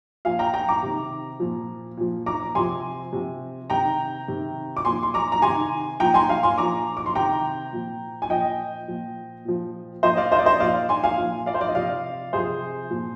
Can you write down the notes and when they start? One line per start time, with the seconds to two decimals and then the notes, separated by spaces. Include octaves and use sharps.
0.25 A#2 F3 F5 G#5
0.39 G5 A#5
0.53 G5 A#5
0.68 A#5 D6
0.82 C3 D#3
1.40 A#2 F3
1.97 A#2 F3
2.26 A#5 D6
2.55 C3 F3 G#5 C6
3.12 C3 F3
3.70 C3 D#3 G5 A#5
4.28 C3 D#3
4.77 D6
4.85 A#2 F3 G#5 C6
5.03 C6
5.14 A#5 D6
5.32 A#5
5.42 C3 D#3 G#5 C6
6.00 A#2 F3 G5 A#5
6.14 G#5 C6
6.29 F5 G#5
6.43 G#5 C6
6.58 A#2 F3 A#5 D6
6.97 D6
7.06 C6
7.15 C3 D#3 G5 A#5
7.72 A#2 F3
8.22 G#5
8.30 A#2 F3 D#5 G5
8.88 A#2 F3
9.45 A#2 F3
10.03 A#2 F3 C5 D#5
10.17 D5 F5
10.31 C5 D#5
10.39 D5
10.45 C5 D#5
10.60 A#2 F3 D5 F5
10.89 G#5 C6
11.04 F5 G#5
11.18 A#2 F3
11.46 D5 F5
11.54 C5
11.61 D5
11.68 D#5
11.75 C3 F3 D5 F5
12.33 C3 F3 G#4 C5
12.90 A#2 F3